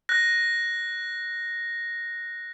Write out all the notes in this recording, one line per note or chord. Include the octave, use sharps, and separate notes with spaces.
F#6 A#6